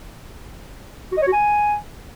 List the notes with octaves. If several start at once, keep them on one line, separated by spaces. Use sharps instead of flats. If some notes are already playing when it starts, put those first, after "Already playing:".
F#4
D#5
C#5
F#4
G#5